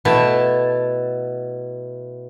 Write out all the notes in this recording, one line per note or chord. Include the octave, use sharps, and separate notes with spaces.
B2 A3 E4 A5